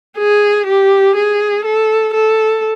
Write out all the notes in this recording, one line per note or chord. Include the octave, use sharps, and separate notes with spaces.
G#4
G4
G#4
A4
A4